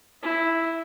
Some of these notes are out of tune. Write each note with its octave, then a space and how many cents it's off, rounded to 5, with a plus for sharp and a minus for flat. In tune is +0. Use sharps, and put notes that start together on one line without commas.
E4 +0 E5 -25